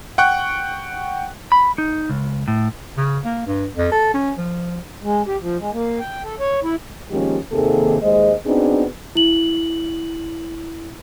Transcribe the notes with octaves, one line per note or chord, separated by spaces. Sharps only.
F#5 G5 C#6 F#6
B5
D#4
C#2
A2
C#3
A#3
G2
F2
A4
C#4
F3
G#3
G4
F3
G#3
A#3
G5
A4
C#5
E4
D#3 F3 G#3 A#3 C#4 G4
D#2 C3 D#3 A#3 G#4 A4
D#2 G#3 G#4 C5 D#5
B3 C4 D4 D#4 F#4 G#4
E4 F#7